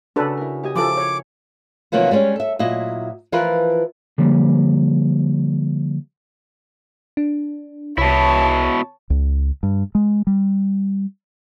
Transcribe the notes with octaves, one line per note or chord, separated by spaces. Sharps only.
C#3 D4 F#4 A4 B4
E4 A#4
G4 D#5 G#5
F3 E4 A4 D6
C#5
C3 D#3 F3 F#3 A#3 B3
G3 G#3 A#3 C#4
A4 E5
A#2 F#3 E4 D#5
E3 F3 F4 A#4 B4
D3 F3 G3 A#3
D4
C2 B2 E4 C#5 A5
C#2
G2
G#3
G3